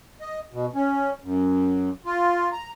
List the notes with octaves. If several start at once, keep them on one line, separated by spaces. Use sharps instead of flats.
D#5
B2
C#4
F#2
F4
A#5